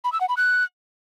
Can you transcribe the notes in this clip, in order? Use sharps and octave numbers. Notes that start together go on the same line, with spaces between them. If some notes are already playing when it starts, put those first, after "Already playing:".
B5
E6
F#5
B5
F#6